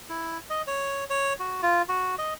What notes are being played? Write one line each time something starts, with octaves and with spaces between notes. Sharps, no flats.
E4
D#5
C#5
C#5
F#4
F4
F#4
D#5